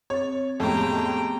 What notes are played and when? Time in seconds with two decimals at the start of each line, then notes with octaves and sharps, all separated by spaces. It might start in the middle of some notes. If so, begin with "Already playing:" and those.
0.10 C4 C#5 A6
0.60 F2 A2 G#3 B3 C#4 G4 G5 A#5